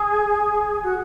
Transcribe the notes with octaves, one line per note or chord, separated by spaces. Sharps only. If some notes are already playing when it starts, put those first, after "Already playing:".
Already playing: G#4
F#4